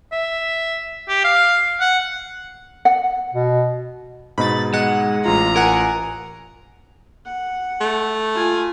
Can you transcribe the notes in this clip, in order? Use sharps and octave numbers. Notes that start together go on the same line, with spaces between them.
E5
G4
F5
F#5
F#5
B2
G#2 B2 D#4 B5 A6
G#3 F#5
A1 F4 A#5
A#4 F#5 G#5
F#5
A3
F4 G#5